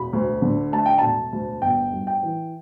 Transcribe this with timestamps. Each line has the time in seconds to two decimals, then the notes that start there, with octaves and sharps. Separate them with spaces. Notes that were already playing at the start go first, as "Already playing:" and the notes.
Already playing: E1 B5
0.13 D2
0.42 D3
0.72 A3 A5
0.86 G5
0.98 E1 A5
1.33 D2
1.62 G1 G5
1.92 G2
2.07 G5
2.23 E3